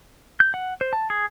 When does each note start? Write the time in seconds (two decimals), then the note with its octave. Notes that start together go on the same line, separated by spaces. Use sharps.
0.40 G6
0.54 F#5
0.81 C5
0.93 A5
1.10 G#4